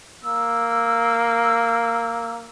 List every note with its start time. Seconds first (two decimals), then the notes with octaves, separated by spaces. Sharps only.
0.23 A#3 E6